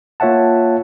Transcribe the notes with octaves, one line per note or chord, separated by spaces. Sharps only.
A#3 F4 C#5 E5 F#5 A5